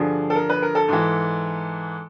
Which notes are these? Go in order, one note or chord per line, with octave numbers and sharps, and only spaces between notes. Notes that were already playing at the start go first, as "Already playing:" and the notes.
Already playing: G2 D3 F3 G#4
A4
A#4
B4
A#4
A4
G#2 E3